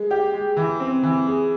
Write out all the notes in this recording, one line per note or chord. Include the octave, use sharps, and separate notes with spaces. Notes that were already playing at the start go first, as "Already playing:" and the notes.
Already playing: G#3
G4
G#3
E3
C4
E3
G#4